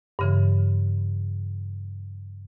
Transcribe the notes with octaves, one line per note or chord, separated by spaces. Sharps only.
G2 C#3 E3